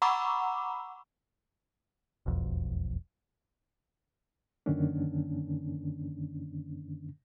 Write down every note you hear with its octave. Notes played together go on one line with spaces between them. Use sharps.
F#5 A#5 B5 C#6 D6 E6
E1 B1 F2
F#2 D3 D#3 A#3 C#4 D4